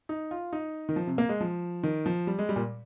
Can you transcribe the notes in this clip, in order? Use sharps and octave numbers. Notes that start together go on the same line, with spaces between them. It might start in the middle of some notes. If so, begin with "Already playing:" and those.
D#4
F4
D#4
D#3
F3
C3
A#3
G#3
F3
D#3
F3
G3
G#3
G3
A#2